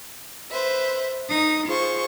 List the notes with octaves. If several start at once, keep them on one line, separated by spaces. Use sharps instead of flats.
B4 C5 E5
D#4 D#6
F4 G#4 C5 C#6